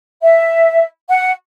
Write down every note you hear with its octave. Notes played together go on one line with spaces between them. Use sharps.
E5
F#5